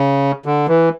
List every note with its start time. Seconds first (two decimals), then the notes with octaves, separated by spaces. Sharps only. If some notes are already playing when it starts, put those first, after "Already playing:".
Already playing: C#3
0.46 D3
0.68 E3